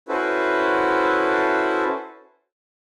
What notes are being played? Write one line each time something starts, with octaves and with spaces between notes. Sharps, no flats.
C#4 E4 F#4 A4 B4 C5